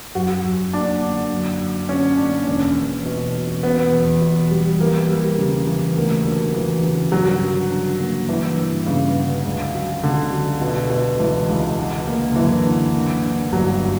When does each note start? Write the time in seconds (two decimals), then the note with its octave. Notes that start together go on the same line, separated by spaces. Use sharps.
0.15 F#2 F#4
0.44 F#2
0.73 A#3 D4
1.02 D3
1.31 F#2
1.60 F#2
1.89 D3 C#4
2.18 A#3 D4
2.47 E1 C#4
2.77 E2
3.06 B2
3.35 B2
3.63 B2 B3
3.93 E2
4.22 B2
4.51 G3
4.80 E3 A#3
5.09 G3
5.39 C#3
5.67 E3
5.96 D2 A#3
6.25 D2
6.54 E3
6.84 C#3
7.12 G2 F#3
7.41 D3
7.71 D4
8.00 A#3
8.28 E3 D4
8.58 G2
8.86 G2 C#3
9.16 D3
9.45 C#2
9.74 F#3
10.03 C#2 D3
10.32 F#3
10.61 B2
10.90 B2
11.20 C#2 E3
11.49 C#2
11.77 D3
12.07 A#3
12.32 D3
12.36 F#2 E3
12.65 D3
12.94 A#3
13.23 D3
13.52 G1 F#3